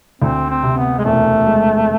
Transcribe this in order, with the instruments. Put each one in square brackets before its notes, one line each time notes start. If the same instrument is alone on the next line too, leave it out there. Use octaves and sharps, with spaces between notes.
[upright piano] D2 [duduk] C4
[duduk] C4
[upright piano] C3
[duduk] B3
G#3
[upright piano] E1 [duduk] A3
[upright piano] G#3